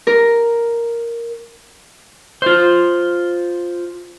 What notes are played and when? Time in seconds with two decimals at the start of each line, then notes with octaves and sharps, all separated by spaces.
0.07 A#4
2.42 F4 C5